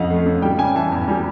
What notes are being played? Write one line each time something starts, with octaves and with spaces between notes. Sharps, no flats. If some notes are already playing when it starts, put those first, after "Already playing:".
Already playing: F2 C#3 F3 D#5 F5 F#5
A3
C#3
G3 G5
C#3 G#5
E3 A5
E2
G3